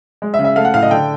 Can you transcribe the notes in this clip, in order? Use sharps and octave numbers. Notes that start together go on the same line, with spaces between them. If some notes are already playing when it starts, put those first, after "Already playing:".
G#3
E5
C#3
E5
A3 F5
F#5
A2 F5
D#5
D3 G5